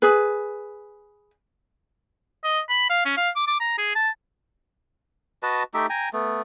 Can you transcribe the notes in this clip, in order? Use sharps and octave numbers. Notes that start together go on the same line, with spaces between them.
G#4 B4
D#5
B5
F5
C#4
F5
D6
D6
A#5
G#4
A5
F#4 B4 D#5 A5
A3 D#4 G4 E5
G5 G#5 A#5
A3 B3